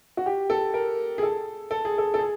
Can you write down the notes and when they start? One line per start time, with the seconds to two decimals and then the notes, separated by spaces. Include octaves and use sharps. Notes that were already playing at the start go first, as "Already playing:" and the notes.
0.17 F#4
0.26 G4
0.50 A4
0.74 A#4
1.18 G#4
1.23 A4
1.71 A4
1.85 G#4
1.98 A4
2.14 A4
2.19 G#4